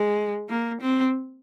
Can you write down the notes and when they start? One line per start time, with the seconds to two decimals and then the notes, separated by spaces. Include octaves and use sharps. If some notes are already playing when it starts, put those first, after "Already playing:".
Already playing: G#3
0.49 A#3
0.81 C4